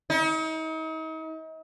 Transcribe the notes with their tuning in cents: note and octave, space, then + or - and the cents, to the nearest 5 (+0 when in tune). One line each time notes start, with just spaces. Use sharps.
D#4 +40